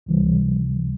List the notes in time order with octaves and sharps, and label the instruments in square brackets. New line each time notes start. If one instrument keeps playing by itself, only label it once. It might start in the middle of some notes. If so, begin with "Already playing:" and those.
[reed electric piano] C#2 C3 E3 G3